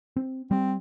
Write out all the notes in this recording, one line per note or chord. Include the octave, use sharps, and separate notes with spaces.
C4
G3 C4